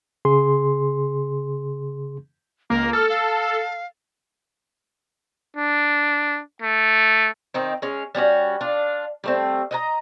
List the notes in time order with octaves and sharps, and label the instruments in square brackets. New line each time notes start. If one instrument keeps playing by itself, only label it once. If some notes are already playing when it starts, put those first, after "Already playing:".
[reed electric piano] C#3 G#4 C6
[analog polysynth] C#2 A#3 [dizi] A#4
[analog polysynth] A4 [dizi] F6
[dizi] F5
[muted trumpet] D4
A3
[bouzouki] D#3 C4 D#4
G#3 C#4
G3 C#4 F4 F#4
D4 F4
G3 A3 C4
D#5 F#5 A#5